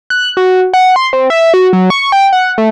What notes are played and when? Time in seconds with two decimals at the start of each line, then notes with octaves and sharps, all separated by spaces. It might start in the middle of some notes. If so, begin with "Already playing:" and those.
0.10 F#6
0.37 F#4
0.73 F#5
0.96 C6
1.13 C4
1.30 E5
1.54 F#4
1.73 F#3
1.90 C#6
2.12 G5
2.33 F#5
2.58 A3